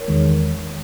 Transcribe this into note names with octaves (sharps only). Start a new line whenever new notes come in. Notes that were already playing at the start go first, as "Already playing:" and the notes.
Already playing: A#4 C#5
E2 D#3 G#3